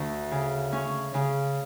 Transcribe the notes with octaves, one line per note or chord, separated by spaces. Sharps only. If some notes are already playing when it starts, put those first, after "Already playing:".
Already playing: D2
C#3
C#4
C#3